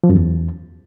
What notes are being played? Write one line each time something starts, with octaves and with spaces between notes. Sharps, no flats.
F3
F#2
E2